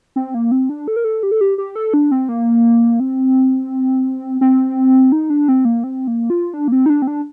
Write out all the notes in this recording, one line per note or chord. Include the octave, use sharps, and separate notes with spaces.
C4
A#3
C4
D4
A4
A#4
A4
G4
A4
G4
G4
A4
D4
C4
A#3
C4
C4
D#4
D4
C4
A#3
C4
A#3
F4
D4
A#3
C4
D#4
D4
C4
D4